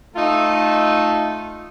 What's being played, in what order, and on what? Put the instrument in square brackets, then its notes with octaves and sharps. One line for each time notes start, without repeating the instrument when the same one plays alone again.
[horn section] A3 D#4 F4 A4